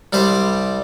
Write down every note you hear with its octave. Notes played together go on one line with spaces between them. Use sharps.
C2 G3 G4 C5